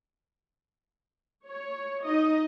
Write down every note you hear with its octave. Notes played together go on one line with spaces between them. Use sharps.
C#5
D#4 D#5